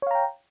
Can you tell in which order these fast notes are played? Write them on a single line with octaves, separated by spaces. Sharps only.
C#5 F5 A#5 G5